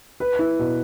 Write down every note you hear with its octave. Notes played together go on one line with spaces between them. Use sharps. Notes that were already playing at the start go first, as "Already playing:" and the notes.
B4
E4
B2